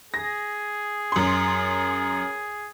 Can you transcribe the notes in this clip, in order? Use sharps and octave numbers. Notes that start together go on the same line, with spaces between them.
G#4 A#6
F#2 C6